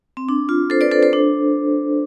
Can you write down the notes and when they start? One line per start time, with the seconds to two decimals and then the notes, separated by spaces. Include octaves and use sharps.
0.17 C4
0.29 D4
0.49 F4
0.70 A4 C5
0.81 B4 D5
0.91 A4 C5
1.03 A4 C5
1.13 D4